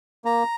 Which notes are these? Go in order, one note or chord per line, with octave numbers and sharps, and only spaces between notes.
A#3 A#5